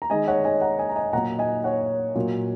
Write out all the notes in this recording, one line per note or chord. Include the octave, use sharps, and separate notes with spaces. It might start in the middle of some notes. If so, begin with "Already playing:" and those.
A#5
D#3 G#3 D#5 G#5
C#5 F#5
D#5 G#5
F#5 A#5
D#5 G#5
A#5
D#5 G#5
A#2 F#3 A#3 F#5 A#5
D#5 G#5
C#5 F#5
A#2 F#3 A#3